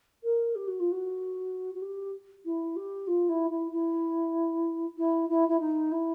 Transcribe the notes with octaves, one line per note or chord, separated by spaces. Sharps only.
A#4
G4
F#4
F4
F#4
F#4
G4
E4
G4
F4
E4
E4
E4
E4
E4
E4
D#4
E4